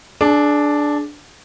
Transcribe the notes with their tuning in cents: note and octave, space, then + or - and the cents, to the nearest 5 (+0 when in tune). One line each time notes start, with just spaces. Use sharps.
D4 +0 G#4 +35